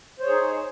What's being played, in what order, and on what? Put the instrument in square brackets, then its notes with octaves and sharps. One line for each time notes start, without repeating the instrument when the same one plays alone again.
[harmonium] C5
C#5
G#4
D#4